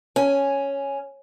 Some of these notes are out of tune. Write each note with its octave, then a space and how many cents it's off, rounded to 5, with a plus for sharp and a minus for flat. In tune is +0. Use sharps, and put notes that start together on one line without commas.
C#4 +0 G#5 +0